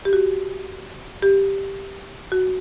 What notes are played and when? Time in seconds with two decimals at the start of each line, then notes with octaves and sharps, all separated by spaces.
0.05 G4
0.13 F#4
1.22 G4
2.32 F#4